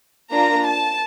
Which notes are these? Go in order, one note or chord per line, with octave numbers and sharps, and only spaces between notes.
A#3 D4 F4 A#5
A5